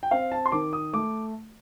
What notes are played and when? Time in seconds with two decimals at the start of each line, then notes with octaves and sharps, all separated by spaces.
0.03 G5
0.11 C4 F5
0.32 A5
0.46 C6
0.52 D#3 D6
0.73 D#6
0.93 A3 D6